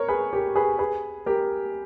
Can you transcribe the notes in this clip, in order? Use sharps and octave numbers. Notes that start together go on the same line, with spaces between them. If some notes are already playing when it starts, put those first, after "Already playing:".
Already playing: A#4 C#5
G#4 B4
G4 A#4
G#4 B4
G#4 B4
G4 A#4